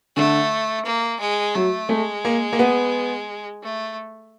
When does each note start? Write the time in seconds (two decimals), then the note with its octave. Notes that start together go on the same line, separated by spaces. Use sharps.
0.16 D3 A3
0.85 A#3
1.20 G#3
1.55 F#3 A3
1.89 G#3 A3
2.25 A#3
2.53 A#3
2.59 B3
3.63 A3